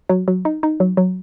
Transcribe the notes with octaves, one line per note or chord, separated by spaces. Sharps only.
F#3
F#3
D#4
D#4
F#3
F#3